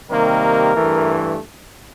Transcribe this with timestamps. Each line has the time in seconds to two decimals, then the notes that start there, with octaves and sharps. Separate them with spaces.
0.10 C3 D#3 G3 A#3 A#4
0.75 G2 E3 A3